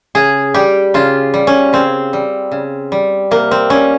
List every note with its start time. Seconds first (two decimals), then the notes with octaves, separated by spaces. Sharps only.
0.15 C#3 G#4
0.54 G3 G4
0.94 C#3 F4
1.34 G3
1.47 C#4
1.73 C#3 C4
2.13 G3
2.52 C#3
2.92 G3
3.31 C3 A#3
3.51 C4
3.70 G3 C#4